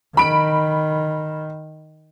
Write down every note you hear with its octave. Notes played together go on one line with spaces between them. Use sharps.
D#3 B5 D7